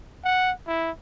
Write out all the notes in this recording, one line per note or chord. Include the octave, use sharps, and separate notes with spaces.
F#5
E4